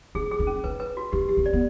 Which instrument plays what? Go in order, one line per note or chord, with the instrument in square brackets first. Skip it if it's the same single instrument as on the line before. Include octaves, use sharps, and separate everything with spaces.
[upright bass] D4 [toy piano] G#4
[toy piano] G#4
[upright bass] D4
[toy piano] C#4
[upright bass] D#4 [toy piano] B4
[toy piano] B4
F#4
[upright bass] D4 [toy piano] G4
[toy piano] G4
[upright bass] C#4
[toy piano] D5
[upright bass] B3